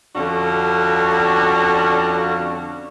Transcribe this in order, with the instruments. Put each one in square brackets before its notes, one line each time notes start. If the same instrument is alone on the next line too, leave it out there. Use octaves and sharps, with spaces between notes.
[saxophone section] F2 D3 C#4 D4 F#4